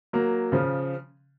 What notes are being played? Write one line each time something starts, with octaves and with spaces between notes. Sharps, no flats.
F#3 A#3
C#3 F3